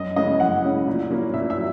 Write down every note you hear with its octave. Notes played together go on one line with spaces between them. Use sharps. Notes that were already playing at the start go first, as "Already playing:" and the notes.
Already playing: F#2 D#5
C#3 G#3 C#4 E4 D#5
F#2 F#5
C#3 G#3 C#4 E4
A#2
F#3 A#3 C#4 E4
A#2 E5
E5
F#3